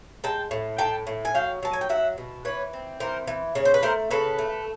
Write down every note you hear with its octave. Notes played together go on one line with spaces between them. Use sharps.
G#3 G5 A5
A2
A2 G5 A5
A2
G#5
F#3 F5 G5
F#3 A5
G#5
G5
F#3 E5 F#5
B2
E3 B4 C#5
C4
E3 A#4 C5
E3
C#3 C#5
C5
B4
A3 A#4 C5
C#3 A4 B4
A3